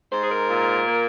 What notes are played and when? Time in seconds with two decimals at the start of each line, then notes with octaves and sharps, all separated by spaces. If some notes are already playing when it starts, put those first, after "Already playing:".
0.12 G#2 C5
0.22 G#4
0.31 A#4
0.50 A#2
0.87 A#3